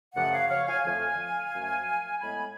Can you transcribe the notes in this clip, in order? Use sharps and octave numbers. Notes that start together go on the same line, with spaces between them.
F#2 C#3 F3 A3 D5 F#5
C#5 F5
C#5 F5
F5 G#5
F2 D3 F3 A3 F5 G#5
F#2 F3 A3
A2 G#3 B3 G#5 B5